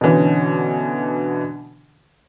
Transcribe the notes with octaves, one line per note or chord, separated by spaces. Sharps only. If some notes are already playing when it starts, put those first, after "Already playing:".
B2 D3 E3 C#4